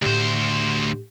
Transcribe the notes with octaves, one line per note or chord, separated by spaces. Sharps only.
D2 A2 G4 C5